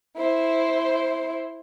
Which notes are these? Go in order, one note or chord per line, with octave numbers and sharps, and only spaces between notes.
E4 C5